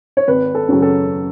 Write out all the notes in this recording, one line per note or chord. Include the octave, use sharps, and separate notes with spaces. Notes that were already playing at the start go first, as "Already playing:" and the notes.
C#5
G#1 B4
A4
F#2 C#3 F#3
A4